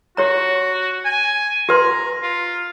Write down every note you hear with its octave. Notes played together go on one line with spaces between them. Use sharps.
F#4 G4 C#5 A#5
G#5
G4 B4 A#5 C6
F4